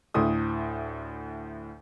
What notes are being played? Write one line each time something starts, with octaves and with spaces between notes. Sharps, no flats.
D2 A2 D#6